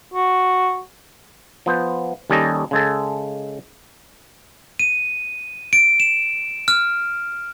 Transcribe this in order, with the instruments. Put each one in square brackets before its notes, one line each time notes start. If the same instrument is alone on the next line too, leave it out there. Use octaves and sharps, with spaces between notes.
[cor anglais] F#4
[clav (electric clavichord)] F3 B3 C5
D#2 G3 C#4 A4 D#5
C#3 G#3 A4
[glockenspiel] D#7
D7
E7
F6